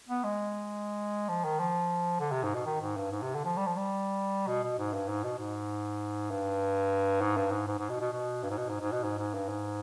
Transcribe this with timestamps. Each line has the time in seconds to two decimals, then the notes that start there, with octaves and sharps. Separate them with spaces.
0.08 B3
0.24 G#3
1.29 F3
1.44 D#3
1.60 F3
2.20 D3
2.32 C3
2.43 G#2
2.55 B2
2.66 D#3
2.81 G#2
2.97 G2
3.11 G#2
3.22 C3
3.35 D3
3.45 F3
3.57 G3
3.67 F3
3.77 G3
4.47 B2
4.64 B2
4.79 G#2
4.93 G2
5.08 G#2
5.24 B2
5.38 G#2
6.31 G2
7.21 G#2
7.37 G2
7.51 G#2
7.67 G#2
7.78 G#2
7.90 B2
8.01 B2
8.12 B2
8.43 G2
8.50 G#2
8.58 B2
8.69 G#2
8.81 G#2
8.92 B2
9.04 G#2
9.18 G#2
9.34 G2
9.49 G#2